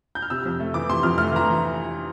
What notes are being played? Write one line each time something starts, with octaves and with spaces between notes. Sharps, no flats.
G6
F6
C3 E6
F2
A3
E3 D6
C3 C6
F2 F6
A3 F6
E3 A#5